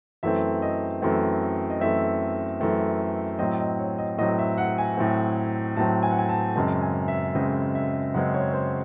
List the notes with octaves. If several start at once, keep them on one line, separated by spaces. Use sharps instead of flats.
F#2 E3 A3 C4 E5
D#5
F#2 E3 A3 C4
D#5
F#2 E3 A3 C4 E5
F#2 E3 A3 C4
A2 F#3 C4 D#5
D#5
C#5
D#5
A2 F#3 C4 D#5
E5
F#5
G#5
A2 F#3 C4
A2 F#3 C4 A5
G#5
F#5
G#5
A5
F#2 C#3 G#3 C4 A5
G#5
E5
F#2 C#3 G#3 C4 D#5
E5
F#2 C#3 G#3 C4 F#5
C#5
C5